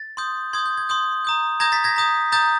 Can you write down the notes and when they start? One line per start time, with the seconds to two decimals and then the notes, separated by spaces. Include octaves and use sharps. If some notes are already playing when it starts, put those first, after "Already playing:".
Already playing: A6
0.17 C6 D#6 G6
0.53 C6 D#6 G6 G#6
0.66 G6
0.77 G#6
0.89 C6 D#6 G6
1.25 A#5 D#6 G6
1.60 A#5 D#6 G6 G#6 A#6
1.72 A6 B6
1.84 G#6 A#6
1.96 A#5 D#6 G6
2.32 A#5 D#6 G6 A6